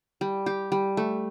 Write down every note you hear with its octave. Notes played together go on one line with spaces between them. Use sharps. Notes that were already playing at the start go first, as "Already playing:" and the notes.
G3
G4
G3
A3